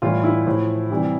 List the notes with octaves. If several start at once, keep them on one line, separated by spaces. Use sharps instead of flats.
A2 E3 G3 F4
E4
A2 F3
C3 E3 G3